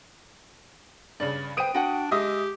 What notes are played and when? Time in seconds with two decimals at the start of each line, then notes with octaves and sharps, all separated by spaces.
1.20 G2 C#3 D5
1.57 B4 C5 G5 D#6 D7 D#7
1.75 D4 F#4 F#5 G5
2.11 G#3 G4 D#5 E5 D#6